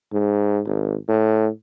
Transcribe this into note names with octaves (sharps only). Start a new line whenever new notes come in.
G#2
G#1
A2